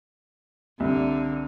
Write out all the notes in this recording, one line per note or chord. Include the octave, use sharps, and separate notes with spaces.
C2 D3